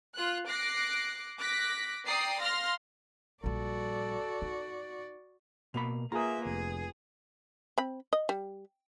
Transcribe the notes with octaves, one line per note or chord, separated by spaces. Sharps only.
F4 F#6
D6 F#6 A#6 C7
D6 F#6 A#6 B6
D5 G5 A#5 D#6 C7
F5 C6 F6 A#6
A#1 G3 F#4 A4 D5
D#4
B2 A#3 B5 F7
A#3 F4 G#4 B4 E5 G#5 A#5 D#6
F1 G#4
C4 B5
D#5
G3